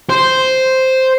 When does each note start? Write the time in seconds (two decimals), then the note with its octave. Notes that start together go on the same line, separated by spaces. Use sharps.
0.10 C5